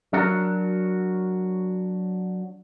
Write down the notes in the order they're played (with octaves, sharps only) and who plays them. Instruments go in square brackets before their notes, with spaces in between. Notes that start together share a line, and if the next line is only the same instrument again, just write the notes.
[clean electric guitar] F#3 D4 F#4 A#4